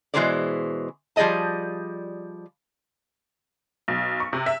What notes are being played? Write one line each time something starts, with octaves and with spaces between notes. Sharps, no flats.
B2 E3 G#3 G#4 C5 D5
F3 G3 G#4 D5 D#5 A5
B1
C#6
C3
E5